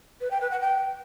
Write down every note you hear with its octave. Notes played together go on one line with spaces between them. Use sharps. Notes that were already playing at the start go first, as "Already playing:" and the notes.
B4
G5
B4
F#5
G5